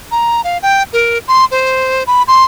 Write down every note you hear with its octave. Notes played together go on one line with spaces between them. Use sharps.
A#5
F5
G5
A#4
C6
C5
B5
C6